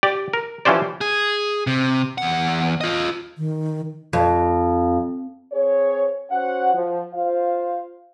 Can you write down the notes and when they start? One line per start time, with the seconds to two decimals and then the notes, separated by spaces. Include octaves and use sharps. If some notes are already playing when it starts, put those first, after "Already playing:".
0.03 G4 D5
0.33 A#4
0.65 E3 F3 C#4 G4 C5 D5
1.01 G#4
1.67 C3
2.18 E2 F#5
2.81 F4 D#5
3.38 D#3
4.13 F2
5.52 C4 G#4 C5 C#5
6.31 C#4 F#4 C5 F#5
6.74 F3
7.14 F4 C5 F5